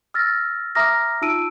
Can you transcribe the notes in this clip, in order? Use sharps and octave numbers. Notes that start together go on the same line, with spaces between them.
E6 F6 A6 A#6
E5 A#5 D6 D#6 F6 A#6
D#4 F4 A5 E6 D7 D#7